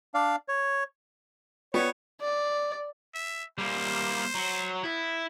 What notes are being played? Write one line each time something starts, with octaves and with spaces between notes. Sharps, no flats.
D4 D5 F5
C#5
B3 F4 C#5 D5 G5
D5
E5
G3 A#3 C5
F#3
B3 E4